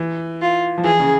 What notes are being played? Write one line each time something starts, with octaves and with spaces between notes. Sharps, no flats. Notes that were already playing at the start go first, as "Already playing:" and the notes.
Already playing: E3
F4
F3
E3 G#4
C#3